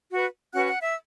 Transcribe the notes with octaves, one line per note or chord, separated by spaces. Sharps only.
F#4 B4
C#4 F#4 B4 F#5 F#6
F#5 F#6
E5 E6